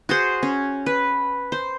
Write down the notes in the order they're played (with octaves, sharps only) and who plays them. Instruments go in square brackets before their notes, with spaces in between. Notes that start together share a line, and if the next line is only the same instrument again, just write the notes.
[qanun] F#4 G#4 C5
C#4
B4
C5